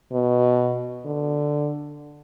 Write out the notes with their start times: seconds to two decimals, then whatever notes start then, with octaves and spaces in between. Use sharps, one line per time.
0.12 B2
1.05 D3